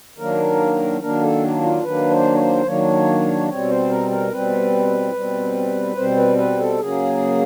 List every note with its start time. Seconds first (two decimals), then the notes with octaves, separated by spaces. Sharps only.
0.18 D#3 F#3 A#3 D4 A#4
1.01 D#3 F#3 A#3 D4 A#4
1.21 A4
1.62 F4
1.83 D#3 F#3 A#3 D4 B4
2.11 C5
2.34 C#5
2.38 C5
2.66 D#3 F#3 A#3 D4 C#5
3.48 B2 G3 C4 C#5
3.69 C5
3.89 A#4
4.11 A#4
4.31 B2 G3 C4 B4
5.13 B2 G3 C4
5.96 B2 G3 C4 C5
6.17 B4
6.38 B4
6.59 A4
6.79 C#3 F#3 A#3 G#4